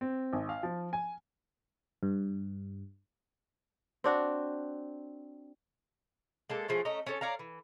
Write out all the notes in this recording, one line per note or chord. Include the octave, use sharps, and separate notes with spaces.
C4
G#1
F5
F3
G#5
G2
C4 D4 F#4
G#3 A#3 A4
F3 G#3 A3 C#4
A3 C#4 D#5 A#5
C#4 A4 C#5
C#5 D5 F5 A#5
E3